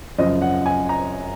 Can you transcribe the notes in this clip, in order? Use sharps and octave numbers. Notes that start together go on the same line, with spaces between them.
F#2 C#3 F3 D#5
F#5
G#5
A#5